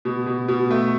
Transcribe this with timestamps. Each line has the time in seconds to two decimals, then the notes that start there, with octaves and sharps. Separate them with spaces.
0.05 B2
0.27 B2
0.48 B2
0.71 A3